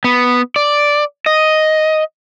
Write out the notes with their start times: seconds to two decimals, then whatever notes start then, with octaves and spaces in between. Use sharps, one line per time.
0.04 B3
0.56 D5
1.26 D#5